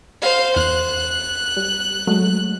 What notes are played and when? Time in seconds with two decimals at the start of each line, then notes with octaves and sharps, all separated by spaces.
0.22 C5 F5
0.56 E2 F#6
1.57 G3
2.07 F#3 G#3 A3